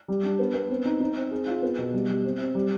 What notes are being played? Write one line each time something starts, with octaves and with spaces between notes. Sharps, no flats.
G3
D4
B3
B3
C4
D#4
D#4
C4
G#4
F4
B3
B2
G3
G3
C4
C4
G3